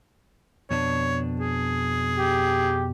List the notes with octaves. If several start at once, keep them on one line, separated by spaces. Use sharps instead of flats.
F2 B2 D4 C#5
G#4
G4